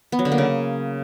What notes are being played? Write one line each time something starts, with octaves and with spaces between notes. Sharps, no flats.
B3
F#3
D3
A#3
C#3